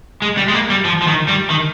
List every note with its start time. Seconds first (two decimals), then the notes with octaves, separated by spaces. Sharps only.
0.22 G#3
0.37 G3
0.48 G#3
0.54 A#3
0.70 G3
0.85 F3
1.02 F3
1.07 D#3
1.28 G3
1.50 D#3